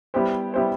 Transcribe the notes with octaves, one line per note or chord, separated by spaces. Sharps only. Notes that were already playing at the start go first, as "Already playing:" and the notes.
G3 B3 E4 G4 C5
G3 B3 E4 G4 C5